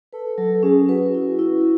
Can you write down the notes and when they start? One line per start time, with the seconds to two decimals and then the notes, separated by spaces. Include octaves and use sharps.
0.13 A4 B4
0.37 F#3 A4
0.54 A4
0.63 C#4 G#4
0.89 F#4 B4
1.14 E4
1.39 E4